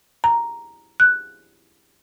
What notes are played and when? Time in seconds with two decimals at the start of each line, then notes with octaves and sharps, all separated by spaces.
0.24 A#5
1.00 F#6